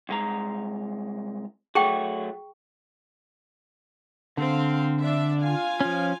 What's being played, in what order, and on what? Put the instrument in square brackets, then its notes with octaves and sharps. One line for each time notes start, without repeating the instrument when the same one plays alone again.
[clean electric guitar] C2 G#3 A#5
[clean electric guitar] F#3 A3 F#4 [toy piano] G#4 G5 C#6
[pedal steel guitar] D3 [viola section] C4 F5
[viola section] D4 E5
F4 F5 G#5
[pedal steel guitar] F3 C#4